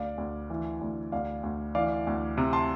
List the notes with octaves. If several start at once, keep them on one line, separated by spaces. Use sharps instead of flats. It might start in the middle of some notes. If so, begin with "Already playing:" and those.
Already playing: D2 D5 F5
D2
E3
D2
D2 D5 F5
D2
E3 D5 F5
D2
C3
A5 C6